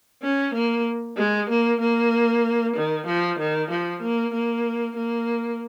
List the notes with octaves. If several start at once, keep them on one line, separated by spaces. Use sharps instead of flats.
C#4
A#3
G#3
A#3
A#3
D#3
F3
D#3
F3
A#3
A#3
A#3